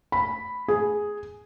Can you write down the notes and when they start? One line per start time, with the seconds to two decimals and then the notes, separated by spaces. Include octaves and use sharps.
0.12 B5
0.68 G#4